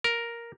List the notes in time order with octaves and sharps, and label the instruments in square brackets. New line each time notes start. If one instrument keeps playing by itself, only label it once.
[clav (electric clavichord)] A#4